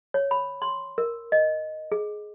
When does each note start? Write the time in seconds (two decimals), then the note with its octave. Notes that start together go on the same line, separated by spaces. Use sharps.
0.14 C#5
0.31 B5
0.62 C6
0.98 A#4
1.32 D#5
1.92 G#4